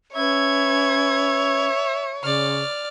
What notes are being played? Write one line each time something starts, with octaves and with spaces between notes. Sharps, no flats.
C#4 B4 C#5 E5 G#6
C#3 D5 F6